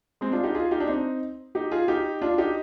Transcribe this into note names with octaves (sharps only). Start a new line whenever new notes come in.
G#3 C4
D4 F4
D#4 G4
F4 G#4
D#4 G4
D4
C4 D#4
D#4 G4
F4 G#4
D#4 G4
D4 F4
D#4 G4